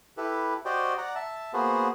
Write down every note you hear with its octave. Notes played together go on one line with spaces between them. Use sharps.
E4 G4 A4 B4
F#4 G4 C5 D5 D#5 G5
D5 F#5 A#5
E5 A5
A#3 B3 F#4 G#4 C5